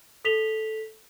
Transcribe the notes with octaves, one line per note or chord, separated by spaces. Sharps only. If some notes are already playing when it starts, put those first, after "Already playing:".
A4 B6 F7 G7